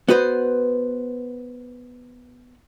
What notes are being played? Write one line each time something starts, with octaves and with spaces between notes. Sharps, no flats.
B3 F#4 B4 C5